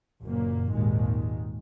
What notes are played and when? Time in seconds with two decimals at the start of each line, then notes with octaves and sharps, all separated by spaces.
0.23 F#1 F#2 A#2 A#3
0.73 G#1 D#2 A#2 D#3 G#3